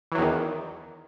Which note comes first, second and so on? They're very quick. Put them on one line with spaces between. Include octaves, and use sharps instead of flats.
E3 F#3 E2 D#3